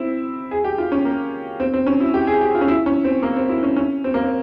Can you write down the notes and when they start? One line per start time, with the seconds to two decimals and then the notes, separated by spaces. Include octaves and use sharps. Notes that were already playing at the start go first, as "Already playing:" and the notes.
Already playing: C4 E4
0.51 G#4
0.64 G4
0.78 F4
0.92 C#4
1.05 A#3
1.60 C4
1.74 C4
1.87 C#4
2.00 E4
2.14 G4
2.27 G#4
2.41 G4
2.55 F4
2.61 C#4
2.68 E4
2.86 C#4
3.04 C4
3.22 A#3
3.36 C4
3.49 E4
3.63 C#4
3.76 C#4
4.04 C4
4.14 A#3
4.24 C4